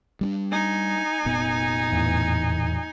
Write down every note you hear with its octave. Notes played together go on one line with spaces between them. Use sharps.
G3 C4 D4
D#4 G#5
F1 A#2 B3
E2 A2 E3